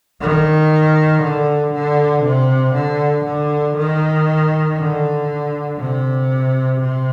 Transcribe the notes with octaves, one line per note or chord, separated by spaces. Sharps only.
D#3
D3
D3
C3
D3
D3
D#3
D3
C3
C3